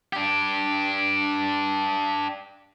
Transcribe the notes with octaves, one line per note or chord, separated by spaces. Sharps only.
D4 G4